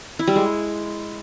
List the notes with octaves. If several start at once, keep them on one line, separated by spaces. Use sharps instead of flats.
E4
G3
G#3